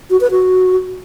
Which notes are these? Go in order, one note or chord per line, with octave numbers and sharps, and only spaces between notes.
F#4
B4
F#4